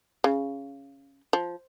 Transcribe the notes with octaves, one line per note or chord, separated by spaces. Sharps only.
C#3
F3